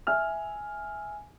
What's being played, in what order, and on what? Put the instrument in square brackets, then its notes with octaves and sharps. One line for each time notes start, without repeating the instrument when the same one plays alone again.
[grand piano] E5 G#5 F6